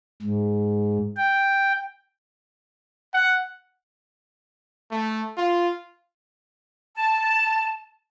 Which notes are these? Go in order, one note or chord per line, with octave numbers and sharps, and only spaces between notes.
G#2
G5
F#5
A3
F4
A5